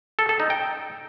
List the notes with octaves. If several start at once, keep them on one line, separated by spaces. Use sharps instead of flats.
A4
A4
D#4
G5